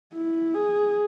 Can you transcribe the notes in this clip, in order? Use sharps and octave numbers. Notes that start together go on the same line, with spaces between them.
E4
G#4